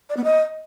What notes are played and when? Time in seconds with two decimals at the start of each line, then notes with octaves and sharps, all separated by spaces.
0.09 D5
0.17 B3
0.24 D#5